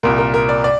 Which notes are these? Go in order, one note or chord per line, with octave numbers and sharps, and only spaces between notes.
C2 A#2 A#4
A#4
A#4
D5
D5